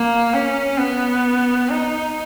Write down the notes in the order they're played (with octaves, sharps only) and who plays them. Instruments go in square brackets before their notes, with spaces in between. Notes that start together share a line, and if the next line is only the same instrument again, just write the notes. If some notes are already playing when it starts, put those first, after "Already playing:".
Already playing: [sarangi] A#3
C#4
B3
D#4